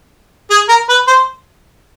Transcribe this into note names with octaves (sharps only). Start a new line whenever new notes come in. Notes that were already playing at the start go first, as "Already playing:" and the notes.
G#4
A#4
B4
C5